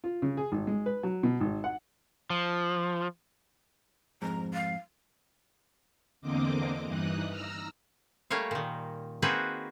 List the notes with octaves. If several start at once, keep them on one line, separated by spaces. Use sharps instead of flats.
F4
C#3
G#4
G#1
G#3
B4
F#3
B2
G#1
F#5
F3
F2 G#2 A#5
F5
E2 D3 A#3 C4 D#5 D6
G2 E3 D#4 D#6 F#6
A#5 E6 F6
G3 A3 A#3 C#5 F5
A#2 D#3
A#3 C4 D#4 F#4 G#4 B4